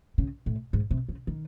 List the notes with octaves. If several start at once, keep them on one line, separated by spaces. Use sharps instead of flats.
C#3
A2
G#2
C3
C#3
D#3